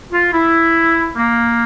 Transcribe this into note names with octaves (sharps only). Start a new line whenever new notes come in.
F4
E4
A#3